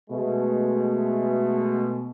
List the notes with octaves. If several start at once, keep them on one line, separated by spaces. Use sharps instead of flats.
B2 G#3 A3